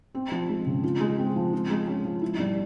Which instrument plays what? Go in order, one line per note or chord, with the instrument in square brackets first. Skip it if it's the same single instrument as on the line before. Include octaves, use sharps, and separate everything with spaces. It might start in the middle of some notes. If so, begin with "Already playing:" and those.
[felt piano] C4
F3
G#3
C#3
F4
G#3
C4
F3
F4
G#3
C#4
F3
E4
G3